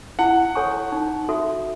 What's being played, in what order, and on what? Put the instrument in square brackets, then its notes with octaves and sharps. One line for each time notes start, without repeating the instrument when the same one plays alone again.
[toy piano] E4 [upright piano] F#5
[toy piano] A4 C#5 G#5 C#6
D#4
F#4 A4 E5